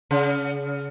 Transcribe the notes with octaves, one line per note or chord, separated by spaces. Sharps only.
C#3